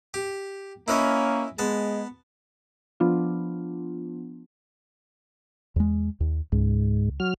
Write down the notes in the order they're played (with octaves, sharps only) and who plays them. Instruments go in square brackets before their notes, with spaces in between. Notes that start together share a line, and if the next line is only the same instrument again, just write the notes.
[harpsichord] G4
[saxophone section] A#3 C#4 [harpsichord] E4 B4 D#5
[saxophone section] G#3 [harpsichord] B3 A5
[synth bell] F3 B3 D4 F4
[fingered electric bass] E2 G#3
D#2
[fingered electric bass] C#2 [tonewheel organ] G#2
[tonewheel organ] F#3 F6